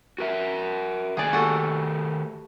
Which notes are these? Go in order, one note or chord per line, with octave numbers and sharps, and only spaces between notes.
F#4 A#4 E5
D#3 A3 G#4 D5 G#5
F#4 G4 A4